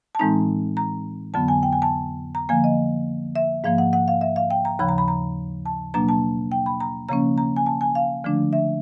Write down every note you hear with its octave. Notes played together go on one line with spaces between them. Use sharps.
A5
A2 E3 G#3 C4 D#4 A#5
A#5
F2 D3 F#3 B3 A5
G#5
G5
G#5
A5
A#5
D3 F3 A#3 G#5
D#5
E5
G#2 F3 A#3 F5
F#5
F#5
F5
E5
F5
G5
A#5
D#2 C#3 F3 B5
A#5
B5
A#5
A5
B2 F#3 A#3 D4 A#5
A5
G5
B5
A#5
C#3 F3 A#3 C#4 A#5
A#5
G#5
A5
G#5
F5
D3 F3 A3 D4
E5